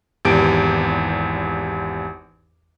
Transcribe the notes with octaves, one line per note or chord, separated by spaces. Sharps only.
G#1 E2 G4 D7